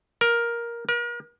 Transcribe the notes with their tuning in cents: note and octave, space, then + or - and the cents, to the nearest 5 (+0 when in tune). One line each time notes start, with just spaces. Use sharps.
A#4 +10
A#4 +40